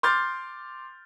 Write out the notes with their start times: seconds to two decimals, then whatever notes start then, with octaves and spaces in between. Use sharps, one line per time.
0.03 C6 D6 F6 G6 A6